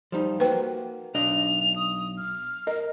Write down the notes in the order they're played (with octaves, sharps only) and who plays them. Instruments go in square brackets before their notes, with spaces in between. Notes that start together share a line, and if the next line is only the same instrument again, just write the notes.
[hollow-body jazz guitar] F3 G3 D#4
[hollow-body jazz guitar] A#3 F#4 [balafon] B4 G5
[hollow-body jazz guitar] B1 D4 D#5 [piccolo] F7
[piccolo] D#6
F6
[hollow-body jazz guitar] A#4 [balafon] D#5